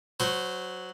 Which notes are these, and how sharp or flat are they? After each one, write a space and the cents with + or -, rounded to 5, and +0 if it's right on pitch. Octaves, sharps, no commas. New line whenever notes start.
F#3 +0 C5 -20 C#6 -15